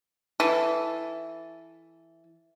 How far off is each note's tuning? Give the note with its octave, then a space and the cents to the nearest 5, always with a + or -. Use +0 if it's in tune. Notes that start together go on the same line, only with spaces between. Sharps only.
E3 +0 A4 +0